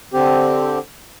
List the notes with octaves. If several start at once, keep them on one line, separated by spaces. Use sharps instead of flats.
D3 C4 G4